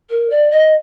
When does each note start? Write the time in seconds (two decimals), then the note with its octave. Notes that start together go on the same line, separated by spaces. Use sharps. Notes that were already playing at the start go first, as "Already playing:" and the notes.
0.10 A#4
0.30 D5
0.51 D#5